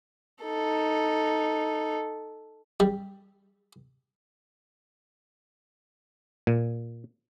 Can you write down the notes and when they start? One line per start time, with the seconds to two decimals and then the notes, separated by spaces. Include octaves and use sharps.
0.43 D#4 A4
2.80 G3
6.47 A#2